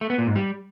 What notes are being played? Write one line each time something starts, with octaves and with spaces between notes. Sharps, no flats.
A3
B3
A#2
G#2
G3